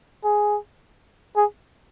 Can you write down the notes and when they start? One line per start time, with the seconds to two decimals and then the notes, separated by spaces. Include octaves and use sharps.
0.24 G#4
1.37 G#4